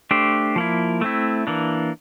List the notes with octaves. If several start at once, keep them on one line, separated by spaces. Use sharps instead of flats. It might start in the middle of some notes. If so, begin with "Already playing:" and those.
A3 D4 G4 C5
F3 A#3 E4
A3 C4 E4
E3 A#3 D4